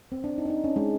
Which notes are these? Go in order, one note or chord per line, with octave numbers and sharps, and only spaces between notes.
C4
D4
D#4
D4
D#4
C#4
G#3